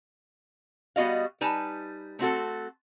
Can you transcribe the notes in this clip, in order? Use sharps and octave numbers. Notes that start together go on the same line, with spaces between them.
G3 B3 F#4 D#5 F5
G3 D#4 B4 G#5 A5
A3 C4 F#4 A4